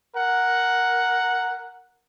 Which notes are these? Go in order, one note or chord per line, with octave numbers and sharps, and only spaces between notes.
A#4 F#5